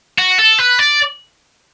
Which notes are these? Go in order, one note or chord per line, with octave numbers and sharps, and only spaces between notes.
F#4
A4
B4
D5